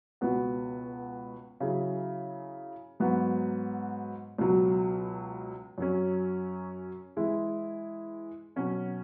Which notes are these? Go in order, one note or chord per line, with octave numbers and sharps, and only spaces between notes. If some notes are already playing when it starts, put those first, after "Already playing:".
C#2 B2 B3 F#4
C#3 F#3 E4 G#4
G#2 F#3 B3 F#4
C#2 B2 F#3
F#2 F#3 C#4
E3 G#3 E4 G#4
B2 F#3 C#4 F#4